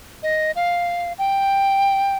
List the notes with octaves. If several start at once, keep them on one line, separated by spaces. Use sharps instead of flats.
D#5
F5
G5